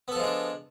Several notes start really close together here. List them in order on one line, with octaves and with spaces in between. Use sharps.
B3 A4 F3 G#3 D4